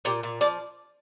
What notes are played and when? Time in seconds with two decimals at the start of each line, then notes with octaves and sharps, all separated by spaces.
0.05 A#2 G4
0.23 A#2
0.41 F3 D5